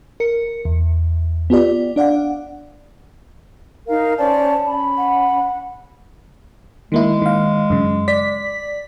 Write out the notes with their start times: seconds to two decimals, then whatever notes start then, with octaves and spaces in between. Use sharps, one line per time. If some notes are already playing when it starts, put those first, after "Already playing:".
0.20 A#4 C#7
0.65 E2
1.50 B3 F4 G4 D5
1.96 D4 D5 F5 F#5
3.87 D#4 A#4 F5
4.18 C#4 C5 D5 A5
4.65 C#4 B5
4.98 F#5
6.92 D#3 G#3 A#3 E4
7.22 D#3 F5
7.70 F#2 C#3
8.08 D5 B6